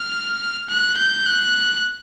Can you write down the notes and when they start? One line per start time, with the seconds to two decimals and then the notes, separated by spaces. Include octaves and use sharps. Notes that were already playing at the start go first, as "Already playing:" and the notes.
Already playing: F6
0.69 F#6
0.97 G6
1.26 F#6